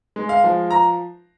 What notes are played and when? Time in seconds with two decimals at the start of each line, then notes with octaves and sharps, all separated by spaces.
0.16 G#3
0.29 F5
0.44 F3
0.71 A#5